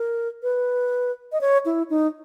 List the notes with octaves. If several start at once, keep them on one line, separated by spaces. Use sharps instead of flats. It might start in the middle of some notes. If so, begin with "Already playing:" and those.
Already playing: A#4
B4
D#5
C#5
E4
D#4